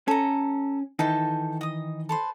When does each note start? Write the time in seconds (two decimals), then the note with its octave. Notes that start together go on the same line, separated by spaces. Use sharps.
0.08 C#4 A4 A#5
0.99 D#3 E3 D#4 A4 G5 A5
1.61 D#5 D#6
2.09 A4 B4 C5